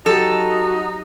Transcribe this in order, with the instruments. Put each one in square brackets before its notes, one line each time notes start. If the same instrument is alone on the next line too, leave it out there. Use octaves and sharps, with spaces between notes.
[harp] F#3 G4 C7 [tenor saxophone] D#4 [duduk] F#4 [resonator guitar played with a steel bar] A4